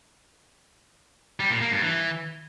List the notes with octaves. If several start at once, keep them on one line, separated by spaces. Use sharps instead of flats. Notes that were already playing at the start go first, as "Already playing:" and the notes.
G3
A#2
A#3
G2
E3